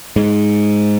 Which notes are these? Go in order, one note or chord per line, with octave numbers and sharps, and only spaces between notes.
G#2